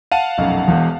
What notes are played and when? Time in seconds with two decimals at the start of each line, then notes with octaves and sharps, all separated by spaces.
0.12 F5 F#5 A5 D#7
0.38 F1 B1 F#2
0.67 E1 E2